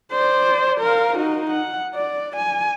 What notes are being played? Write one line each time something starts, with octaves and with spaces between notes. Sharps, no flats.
C5 D5
A#4 F5
D#4 F#4
F#5
D5
G#5